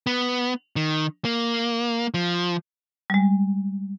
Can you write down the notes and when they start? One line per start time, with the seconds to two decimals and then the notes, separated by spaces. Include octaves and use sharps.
0.07 B3
0.76 D#3
1.25 A#3
2.14 F3
3.10 G3 G#3